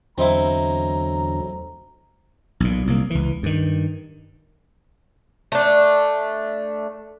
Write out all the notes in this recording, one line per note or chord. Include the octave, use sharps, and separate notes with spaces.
E2 D3 F#3 C4 D#4 E4 A#5
B1 A#2
C2 A#3
C#2 E3
G2 D#3
A3 D4